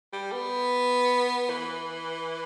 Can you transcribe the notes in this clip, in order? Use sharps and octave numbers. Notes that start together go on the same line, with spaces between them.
G3
B3
E3